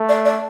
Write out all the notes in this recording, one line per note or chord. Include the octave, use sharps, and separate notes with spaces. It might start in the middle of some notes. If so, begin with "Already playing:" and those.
Already playing: A3
D5
D5